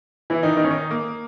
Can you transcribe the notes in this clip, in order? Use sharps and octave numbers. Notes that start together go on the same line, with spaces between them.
E3 E4
D#3 D#4
D#3 D#4
C#4
D#3 D#4
A#3